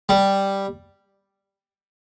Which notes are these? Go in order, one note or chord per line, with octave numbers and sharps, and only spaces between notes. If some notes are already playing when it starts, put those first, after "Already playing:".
G3